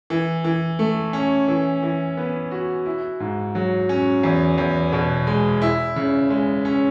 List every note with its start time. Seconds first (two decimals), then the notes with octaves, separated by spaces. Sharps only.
0.10 E3
0.44 E3
0.79 A3
1.13 C#4
1.48 E3
1.83 E3
2.17 B3
2.51 F#4
2.86 E4
3.20 G#2
3.55 F#3
3.89 C#4
4.23 E2
4.58 E2
4.92 B2
5.27 G#3
5.62 E4
5.96 C#3
6.30 G#3
6.65 C#4